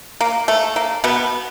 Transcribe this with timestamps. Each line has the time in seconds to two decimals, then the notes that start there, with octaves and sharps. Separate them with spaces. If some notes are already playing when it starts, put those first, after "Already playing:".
0.21 A#3
0.48 A3
0.76 A#3
1.04 B2 B3